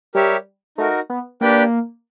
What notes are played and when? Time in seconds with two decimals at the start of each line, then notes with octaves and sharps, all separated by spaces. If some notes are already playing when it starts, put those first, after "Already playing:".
0.15 G3 G4 A#4 C#5 E5
0.78 A3 D#4 F#4 A#4
1.10 B3
1.41 A#3 D4 G4 B4 D5 G5